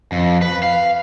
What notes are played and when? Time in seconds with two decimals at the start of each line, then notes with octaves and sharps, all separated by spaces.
0.12 F2
0.42 B4
0.63 F5